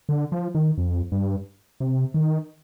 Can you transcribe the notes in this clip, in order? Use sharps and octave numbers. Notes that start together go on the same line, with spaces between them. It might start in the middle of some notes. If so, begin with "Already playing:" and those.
D3
F3
D#3
F2
G2
C3
D#3